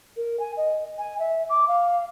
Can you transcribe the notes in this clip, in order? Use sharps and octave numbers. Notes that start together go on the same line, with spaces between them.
A#4
G#5
D#5
G#5
E5
D6
F5